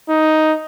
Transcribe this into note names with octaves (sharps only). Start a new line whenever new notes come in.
D#4